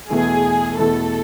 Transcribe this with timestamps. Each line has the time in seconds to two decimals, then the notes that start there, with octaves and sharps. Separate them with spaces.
0.10 E2 B2 A3 E4 G#4
0.78 E2 B2 A3 E4 A4